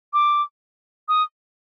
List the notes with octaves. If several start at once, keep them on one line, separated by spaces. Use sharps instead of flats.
D6
D#6